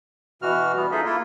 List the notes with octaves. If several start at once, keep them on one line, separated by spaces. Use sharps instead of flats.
B2 E3 F#4 F6
E3 G3 B3
D#4 F4 G#4 A4 D#5 E5
A#3 E4 F4